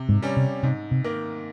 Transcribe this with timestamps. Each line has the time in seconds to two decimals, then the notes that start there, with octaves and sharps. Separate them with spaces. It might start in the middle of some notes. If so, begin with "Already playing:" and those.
Already playing: C3
0.09 G#2
0.22 G3 C#4
0.37 C3
0.63 G#2 C3
0.91 C3
1.04 D#3 A#3